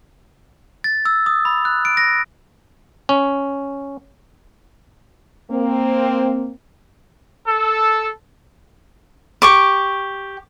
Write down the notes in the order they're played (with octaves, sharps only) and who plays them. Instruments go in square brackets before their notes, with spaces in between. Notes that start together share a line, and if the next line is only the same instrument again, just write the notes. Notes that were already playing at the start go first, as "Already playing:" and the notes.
[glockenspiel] A6
E6
D#6
B5
F#6
D7
A#6
[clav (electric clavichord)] C#4
[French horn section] A#3 C4
[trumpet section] A4
[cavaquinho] G4 C#6 D6